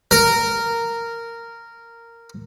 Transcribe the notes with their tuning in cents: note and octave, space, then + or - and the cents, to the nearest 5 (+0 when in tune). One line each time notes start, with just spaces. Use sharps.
A#4 -10